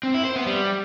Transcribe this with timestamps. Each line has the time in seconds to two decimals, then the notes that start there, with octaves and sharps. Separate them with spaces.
0.03 C4
0.14 E4
0.25 C5
0.36 B3
0.46 G3